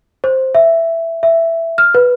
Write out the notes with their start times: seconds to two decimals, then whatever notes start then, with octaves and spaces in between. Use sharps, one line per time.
0.24 C5
0.55 E5
1.23 E5
1.78 F6
1.95 B4